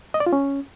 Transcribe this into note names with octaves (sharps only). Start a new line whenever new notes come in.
D#5
D5
F4
C#4